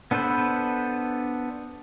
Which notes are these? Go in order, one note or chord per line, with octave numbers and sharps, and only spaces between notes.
B3 D4 A4 B4 C5